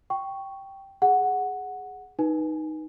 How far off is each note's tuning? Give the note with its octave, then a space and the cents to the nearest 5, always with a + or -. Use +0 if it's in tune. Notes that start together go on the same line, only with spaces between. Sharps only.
G5 -5 C#6 +0
G#4 +0 F#5 +0
D#4 +0 B4 -20 G#5 +0